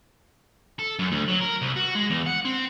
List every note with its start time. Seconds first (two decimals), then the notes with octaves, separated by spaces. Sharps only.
0.79 A4
0.99 F#2
1.12 D2
1.28 F#3
1.41 A#4
1.62 C2
1.76 F#4
1.95 G#3
2.10 E2
2.26 F#5
2.45 C4